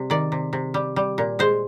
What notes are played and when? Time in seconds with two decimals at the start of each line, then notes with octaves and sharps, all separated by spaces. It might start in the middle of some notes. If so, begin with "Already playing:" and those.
Already playing: C3 G3
0.10 D#3 D5
0.32 C3
0.53 C3
0.74 G3
0.96 G3
1.18 A#2
1.39 G#3 C5